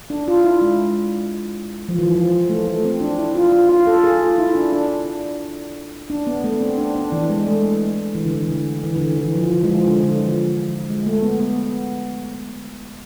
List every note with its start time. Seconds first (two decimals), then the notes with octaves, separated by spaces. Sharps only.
0.10 D4
0.28 F4
0.45 E4
0.62 G#3
1.89 F3
1.99 E3
2.15 F3
2.50 A3
2.67 A3
2.85 C4
3.01 D4
3.18 E4
3.35 F4
3.52 F4
3.69 F4
3.87 A4
4.04 G#4
4.21 F4
4.38 E4
4.55 D4
4.72 D4
6.10 D4
6.27 B3
6.44 A3
6.61 C4
6.78 D4
6.96 D4
7.12 E3
7.30 G#3
7.47 A3
8.15 E3
8.25 D3
8.35 E3
8.49 D3
8.83 E3
8.96 D3
9.00 E3
9.17 E3
9.35 F3
9.51 E3
9.63 G#3
9.69 F3
9.86 D3
10.03 D3
10.21 F3
10.89 G#3
11.06 A3
11.23 B3
11.40 B3